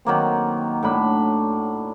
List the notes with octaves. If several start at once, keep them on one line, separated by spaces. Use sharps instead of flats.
D#3 F#3 A#3 C4
A2 D4 B5